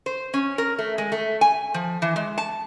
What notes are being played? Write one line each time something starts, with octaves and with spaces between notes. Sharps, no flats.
C5
C#4
A#4
A3
G#3
A3
G#5
F3
E3
G#3
A5